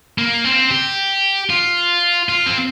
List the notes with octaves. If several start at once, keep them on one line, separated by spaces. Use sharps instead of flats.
A#3
C4
G4
F4
F4
C4